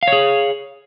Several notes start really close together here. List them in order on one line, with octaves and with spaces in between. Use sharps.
F5 C#5 G#4